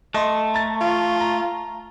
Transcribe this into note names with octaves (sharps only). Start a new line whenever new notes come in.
A3 D#5 C6
A#5 A6
F4
A#5